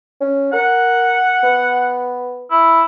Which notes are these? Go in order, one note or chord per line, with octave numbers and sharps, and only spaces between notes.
C#4
A#4 F#5
B3
E4